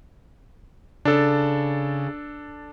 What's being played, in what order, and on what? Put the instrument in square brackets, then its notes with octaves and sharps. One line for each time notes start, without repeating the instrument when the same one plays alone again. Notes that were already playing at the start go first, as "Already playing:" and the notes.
[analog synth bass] C#3 [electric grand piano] D4 A4